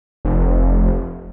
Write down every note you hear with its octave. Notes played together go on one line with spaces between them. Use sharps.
F1